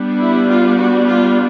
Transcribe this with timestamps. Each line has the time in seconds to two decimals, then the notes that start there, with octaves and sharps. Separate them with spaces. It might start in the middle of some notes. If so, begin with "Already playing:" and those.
Already playing: G3 B3 D4
0.20 E4
0.49 F4
0.77 F#4
1.05 F4